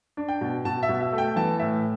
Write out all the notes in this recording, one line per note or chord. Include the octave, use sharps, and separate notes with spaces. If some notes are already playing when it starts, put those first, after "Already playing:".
D4
G5
B2
B2 A5
E5
B2
E5
A3
G5
E3 A5
A2 E5